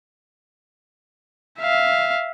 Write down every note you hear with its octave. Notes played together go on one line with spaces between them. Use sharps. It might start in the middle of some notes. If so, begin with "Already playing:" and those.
E5 F5